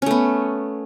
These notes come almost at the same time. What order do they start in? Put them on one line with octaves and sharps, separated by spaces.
C#4 A3 B3